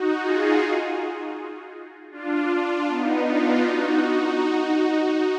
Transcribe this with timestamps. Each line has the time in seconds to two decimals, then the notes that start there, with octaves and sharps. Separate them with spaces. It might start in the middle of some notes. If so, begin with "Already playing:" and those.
Already playing: D#4 F#4
0.20 F4 G#4
2.11 D4 F4
2.88 B3 D#4
3.26 D4 F4
3.65 D#4 F#4